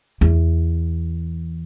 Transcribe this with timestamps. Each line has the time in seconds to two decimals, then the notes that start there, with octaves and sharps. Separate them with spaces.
0.21 E2